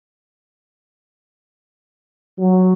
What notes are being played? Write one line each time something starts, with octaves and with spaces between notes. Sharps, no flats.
F#3